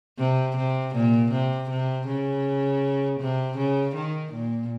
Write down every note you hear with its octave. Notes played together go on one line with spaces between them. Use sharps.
C3
C3
A#2
C3
C3
C#3
C3
C#3
D#3
A#2